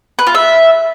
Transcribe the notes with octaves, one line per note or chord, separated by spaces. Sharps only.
B4
F4
E5